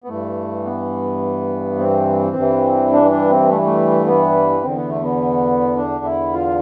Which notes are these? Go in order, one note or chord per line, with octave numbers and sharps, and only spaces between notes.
B3
G2 E3 A3
B3
C4
G2 E3
D4
D4
C4
A3
A3
B3
E2 D3 C4
B3
A3
B3
D4
E4
F4